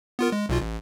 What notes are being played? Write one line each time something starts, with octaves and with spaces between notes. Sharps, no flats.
B3 F4 A#4
G#3
B1 B2 F4
A1